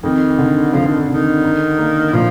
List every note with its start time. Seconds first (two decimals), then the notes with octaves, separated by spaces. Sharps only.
0.03 F2 D#3
0.38 D3
0.73 D3 F3
0.86 D#3
1.08 D3 D#3
1.43 D#4
1.78 A#3
2.13 A#2 F3